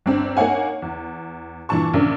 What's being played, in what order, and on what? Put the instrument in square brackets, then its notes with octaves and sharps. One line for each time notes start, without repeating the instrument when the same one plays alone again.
[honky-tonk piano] G1 C4 D4
A#3 D#4 C#5 F#5 G#5
E2
G2 A#2 E3 D4 A5 C#6
A#1 C#3 A#3 D4